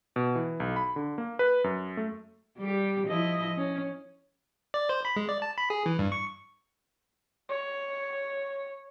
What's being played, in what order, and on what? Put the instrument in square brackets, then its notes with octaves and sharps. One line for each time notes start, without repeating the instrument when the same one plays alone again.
[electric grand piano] B2
E3
B1
B5
D3
A#3
B4
F#2
A3
[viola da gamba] G3 G4
F3 E4 D#5
C#4
[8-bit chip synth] D5
C5
B5
G#3
D5
A5
B5
G#4
E3
G2
C#6
[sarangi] C#5